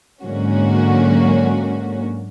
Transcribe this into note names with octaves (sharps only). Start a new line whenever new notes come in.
G#2 D3 F#3 A#3 C#4 F#4